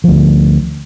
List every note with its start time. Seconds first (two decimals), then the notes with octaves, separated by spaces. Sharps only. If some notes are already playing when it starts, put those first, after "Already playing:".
0.04 D2 F3